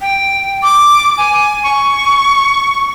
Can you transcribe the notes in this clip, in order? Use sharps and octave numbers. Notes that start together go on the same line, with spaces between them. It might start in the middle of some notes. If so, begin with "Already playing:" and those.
G5
D6
G#5
C#6